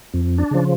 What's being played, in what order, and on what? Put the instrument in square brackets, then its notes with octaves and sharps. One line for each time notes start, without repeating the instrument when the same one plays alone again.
[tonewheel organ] F2
D4
C#3 F3